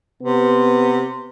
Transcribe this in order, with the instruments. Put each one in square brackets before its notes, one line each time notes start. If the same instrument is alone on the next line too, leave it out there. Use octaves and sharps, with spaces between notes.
[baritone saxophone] C3 [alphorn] B3